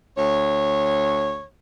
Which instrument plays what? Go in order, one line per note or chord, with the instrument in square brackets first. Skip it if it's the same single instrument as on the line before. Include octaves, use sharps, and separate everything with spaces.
[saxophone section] D2 C#5